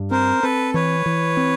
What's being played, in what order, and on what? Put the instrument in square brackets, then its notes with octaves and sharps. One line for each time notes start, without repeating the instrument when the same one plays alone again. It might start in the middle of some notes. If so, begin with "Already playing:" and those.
Already playing: [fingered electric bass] G2
[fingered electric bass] C4 [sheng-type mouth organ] A#4 C5
[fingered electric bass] C4 [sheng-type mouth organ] A4 B4
[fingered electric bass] E3 [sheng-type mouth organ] B4 C#5
[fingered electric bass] E3
C4